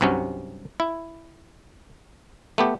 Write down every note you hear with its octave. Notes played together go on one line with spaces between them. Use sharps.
C2 G2 C3 F#3 C#4
E4
A3 B3 G4